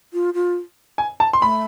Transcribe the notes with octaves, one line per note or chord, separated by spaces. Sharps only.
F4
F4
G#5
A5
C6
A3 B5